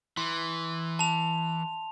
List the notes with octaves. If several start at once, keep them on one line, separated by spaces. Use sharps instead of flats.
E3 C6
A5 F7